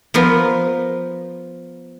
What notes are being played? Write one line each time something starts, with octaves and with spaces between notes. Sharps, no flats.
F3 B3 A#4 C6